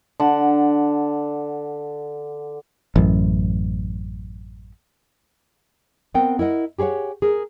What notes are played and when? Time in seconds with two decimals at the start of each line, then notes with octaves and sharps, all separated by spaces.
0.20 D3 F#5 A5
2.96 A1 F#2
6.14 B3 C4 A#4 F#5 G5
6.39 E4 A#4 D#5 F#5
6.78 G4 G#4 B4 C#5 F#5
7.22 G#4 A#4